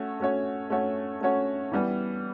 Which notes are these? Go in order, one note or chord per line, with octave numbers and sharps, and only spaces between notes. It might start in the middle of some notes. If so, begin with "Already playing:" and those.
Already playing: A3 C#4 F#4 C#5
A3 C#4 F#4 C#5
A3 C#4 F#4 C#5
A3 C#4 F#4 C#5
E3 G3 B3